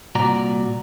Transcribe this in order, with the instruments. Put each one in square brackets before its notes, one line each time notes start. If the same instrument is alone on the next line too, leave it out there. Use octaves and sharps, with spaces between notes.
[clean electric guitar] C2 A#2 F#4 D5 A#5